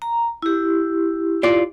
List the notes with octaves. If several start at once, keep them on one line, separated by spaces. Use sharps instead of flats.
A#5
E4 G4
F4 D5